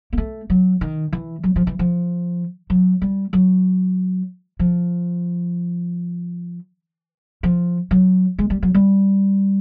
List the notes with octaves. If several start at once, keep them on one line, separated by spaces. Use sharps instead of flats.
A#3
A3
F#3
D#3
E3
F#3
F3
E3
F3
F#3
G3
F#3
F3
F3
F#3
G#3
G3
F#3
G3